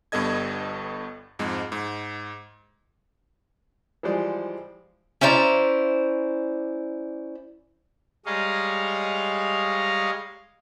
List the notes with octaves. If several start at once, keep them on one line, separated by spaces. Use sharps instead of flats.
G1 G2 B3 A4 D#5 G#6
F2 G#2 G#3
G#2
E3 F3 G3 G#3 C5 D5
C#4 E4 C5 D5 A#5
G3 G#3 C#5 D#5 F5 A#5